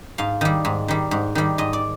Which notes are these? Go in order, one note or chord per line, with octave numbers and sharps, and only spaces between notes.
G#2 F5
D#3 G3
G#2
D#3 G3
G#2
D#3 G3
G#2 D#5
D5